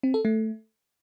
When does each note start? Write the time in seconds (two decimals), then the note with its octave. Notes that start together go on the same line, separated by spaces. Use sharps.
0.03 C4
0.14 A4
0.25 A3